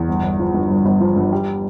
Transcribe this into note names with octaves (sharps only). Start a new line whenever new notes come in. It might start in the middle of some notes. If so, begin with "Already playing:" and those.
Already playing: E2
G1
G1
F3
G2
G1
G1
F3
G2
G3